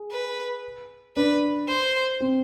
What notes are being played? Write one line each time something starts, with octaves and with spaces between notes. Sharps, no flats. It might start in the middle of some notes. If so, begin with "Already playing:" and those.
Already playing: G#4
B4
D4 B4
C5
C4